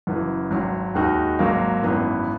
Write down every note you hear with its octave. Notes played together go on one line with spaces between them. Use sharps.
F#1 F#2 E3
G#1 G#2 F#3
D#2 D#3 G#3 D#4 F#4
G#1 G#2 F#3 A#3
G#1 F#2 E3 B3